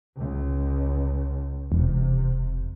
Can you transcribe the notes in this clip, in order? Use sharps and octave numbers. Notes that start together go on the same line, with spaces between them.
C#2
E1 C3